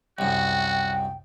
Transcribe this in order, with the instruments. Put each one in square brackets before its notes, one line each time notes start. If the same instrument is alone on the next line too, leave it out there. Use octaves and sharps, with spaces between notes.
[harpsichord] C2 F#2 [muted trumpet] F#4 [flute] G5